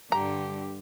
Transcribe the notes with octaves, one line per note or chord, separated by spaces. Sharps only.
G2 D3 G4 A#5